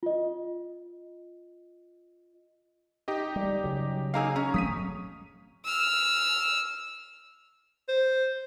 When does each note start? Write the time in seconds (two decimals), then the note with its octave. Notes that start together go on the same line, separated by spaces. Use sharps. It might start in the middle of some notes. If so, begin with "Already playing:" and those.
0.03 F4 D#5
3.08 D#4 G4 D#5
3.36 G3
3.64 C#3 F#3
4.14 A#3 D#4 G#4 F5 A#5 E6
4.36 C#4 A#5
4.54 F#3 A3 C4 D#6 B6 D#7
5.65 E6 F6
7.89 C5